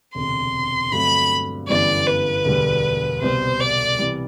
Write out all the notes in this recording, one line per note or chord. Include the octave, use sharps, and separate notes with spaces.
E1 D2 C3 C6
G2 D3 F#3 A3 C4 B5
G1 F#2 E3 G3 B3 D5
B4
E1 D2 D3 G3
C2 B2 G3 C5
D5
C3 E3 G3